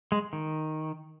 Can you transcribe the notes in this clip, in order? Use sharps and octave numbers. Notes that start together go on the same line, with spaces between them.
G#3
D#3